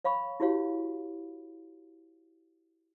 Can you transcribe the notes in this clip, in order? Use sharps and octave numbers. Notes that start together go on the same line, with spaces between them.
C#5 F5 B5 C#6
E4 F#4 G4 C#5 F5